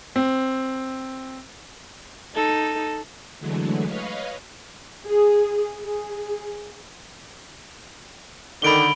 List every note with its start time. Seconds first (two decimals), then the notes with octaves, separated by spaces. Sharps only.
0.16 C4
2.35 D#4 A4
3.39 D3 E3 F#3 G#3 A3
3.88 B4 C#5 D#5 F5
5.07 G#4
5.83 G#4
8.62 D3 D#3 B5 D7 G7